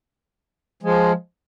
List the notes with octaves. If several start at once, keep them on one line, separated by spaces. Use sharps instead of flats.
F3 G#3